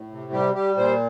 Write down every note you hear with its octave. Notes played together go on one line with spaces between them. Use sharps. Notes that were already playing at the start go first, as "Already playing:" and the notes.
Already playing: A2
C3
G3 G4
G3 G4
A#2 C5